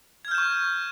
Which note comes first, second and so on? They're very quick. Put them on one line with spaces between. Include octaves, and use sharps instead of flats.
G#6 F6 G6 E7 C#6